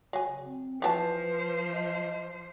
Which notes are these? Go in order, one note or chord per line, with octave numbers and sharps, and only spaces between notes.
C#3 F#3 G#5
C4
E3 F3 G4 B4 C5 A5
D#5